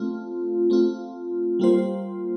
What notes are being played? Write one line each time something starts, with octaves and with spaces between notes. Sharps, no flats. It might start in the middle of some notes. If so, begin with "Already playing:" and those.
Already playing: A3 C4 F4
A3 C4 F4
G3 A#3 F4 C5